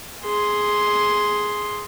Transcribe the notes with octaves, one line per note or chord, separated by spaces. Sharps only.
G#4 C6